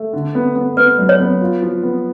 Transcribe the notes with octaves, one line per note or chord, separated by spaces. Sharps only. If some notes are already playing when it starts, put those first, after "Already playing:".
Already playing: A3
D3
B3
B3
B3 B4
F#2
C#5
B3
F4
F3
B3